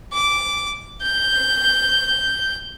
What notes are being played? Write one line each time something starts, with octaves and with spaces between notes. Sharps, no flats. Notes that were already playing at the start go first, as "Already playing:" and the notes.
D6
G6